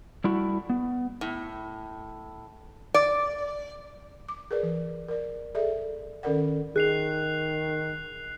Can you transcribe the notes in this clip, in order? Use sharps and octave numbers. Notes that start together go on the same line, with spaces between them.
G3 A3 E4 F#4
B3
A2
D5
D6
G#4 A#4 B4 D5
E3
A#4 D5
G#4 A4 D5 E5
D#3 C#4 A4 A#4 D5 F#5
D#3 G#4 F#6 C7 F7